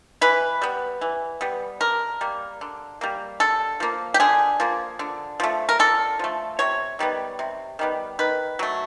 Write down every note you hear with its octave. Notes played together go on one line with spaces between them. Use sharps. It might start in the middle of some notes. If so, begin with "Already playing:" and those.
E3 B4
G3 B3
E3
G3 B3
D3 A#4
G3 A#3
D3
G3 A#3
D3 A4
F3 A#3
G4
D3 G#4
F3 A#3
D3
F3 A3
A#4
D3 A4
F3 A3
C3 C#5
D#3 G3 B3
C3
D#3 G3 B3
D#3 B4
F#3 A3